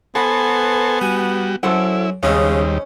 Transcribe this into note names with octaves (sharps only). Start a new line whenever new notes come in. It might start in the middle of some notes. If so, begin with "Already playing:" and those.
B3 A4 B4 C5 F#5 G#5
G3 F#4 G#5
F#2 E4 A4 C5 F#5
D#2 C#3 G3 G#3 C4 C#4 D#4